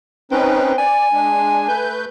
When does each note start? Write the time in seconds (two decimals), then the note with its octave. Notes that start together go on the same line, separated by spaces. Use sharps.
0.31 C4 C#4 D#4 B4
0.78 D5 G#5
1.12 G#3 D4
1.68 A3 B4 G6